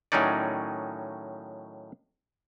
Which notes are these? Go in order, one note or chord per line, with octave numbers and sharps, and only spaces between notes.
A2 D#3 F#3 C#4 D#4 D5